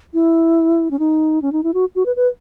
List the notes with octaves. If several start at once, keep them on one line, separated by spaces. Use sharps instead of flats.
E4
C#4
D#4
C#4
D#4
E4
F#4
F#4
B4
B4